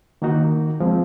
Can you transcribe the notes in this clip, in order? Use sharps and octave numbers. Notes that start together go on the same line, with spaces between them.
D#3 A#3 D#4 F#4
F3 G#3 C4